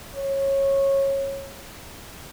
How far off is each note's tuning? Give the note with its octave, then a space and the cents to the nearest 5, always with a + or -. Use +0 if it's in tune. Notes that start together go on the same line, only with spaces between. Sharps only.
C#5 -20